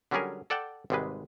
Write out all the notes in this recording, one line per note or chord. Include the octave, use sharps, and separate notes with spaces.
D3 F#3 G3 C#4 G#4 A#4
A4 D5 F#5 G5 A5
G#1 G#2 C3 G3 G#3 B4